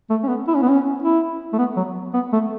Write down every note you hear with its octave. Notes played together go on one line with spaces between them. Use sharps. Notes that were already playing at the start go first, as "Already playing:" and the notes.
A3
C#4
B3
E4
C#4
B3
C#4
E4
A3
B3
F#3
B3
A3